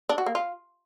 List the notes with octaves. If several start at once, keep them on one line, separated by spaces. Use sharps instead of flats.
D4
F#4
A#3
F4